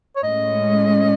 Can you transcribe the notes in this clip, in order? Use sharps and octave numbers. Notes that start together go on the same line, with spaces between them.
C#5
A2 G#3 C#4 D#5